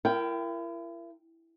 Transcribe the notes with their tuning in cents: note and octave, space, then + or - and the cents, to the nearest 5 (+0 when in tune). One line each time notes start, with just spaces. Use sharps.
E4 +40 A#4 +0 G5 +0